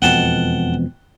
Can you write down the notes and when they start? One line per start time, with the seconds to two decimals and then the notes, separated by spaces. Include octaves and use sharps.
0.02 E1 F2 B2 F#5 G5 A5